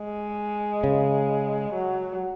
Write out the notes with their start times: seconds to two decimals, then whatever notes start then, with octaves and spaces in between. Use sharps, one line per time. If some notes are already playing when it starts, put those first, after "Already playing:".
Already playing: G#3
0.84 C#3
1.74 F#3